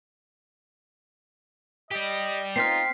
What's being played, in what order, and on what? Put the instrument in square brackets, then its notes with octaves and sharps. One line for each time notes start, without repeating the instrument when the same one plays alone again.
[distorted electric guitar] G4 D5 [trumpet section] D#5
[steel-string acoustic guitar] C4 [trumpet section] D#4 F4 [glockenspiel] F6 B6 C7